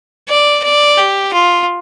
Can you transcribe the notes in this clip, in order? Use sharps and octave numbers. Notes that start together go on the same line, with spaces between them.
D5
D5
G4
F4